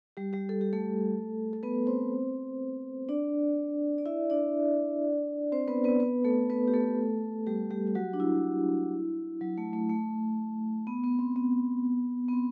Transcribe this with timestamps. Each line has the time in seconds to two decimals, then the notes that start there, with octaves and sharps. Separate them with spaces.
0.17 G3 G4
0.33 G3 G4
0.49 A4
0.61 G4
0.73 A3 A4
1.53 A4
1.63 B3 B4
1.87 C4 C5
3.09 D4 D5
3.98 D5
4.06 E4 E5
4.30 D4 D5
5.52 C4 C5
5.68 B3 B4
5.84 B3 B4
6.00 B3 B4
6.24 A3 A4
6.50 B3 B4
6.68 G4
6.74 A3 A4
7.47 G3 G4
7.71 G3 G4
7.87 G4
7.95 F#3 F#4
8.13 D4
8.20 E4
9.41 F#3
9.58 A3
9.73 A3
9.89 A3
10.87 B3
11.04 B3
11.19 C4
11.36 B3
12.29 B3
12.33 C4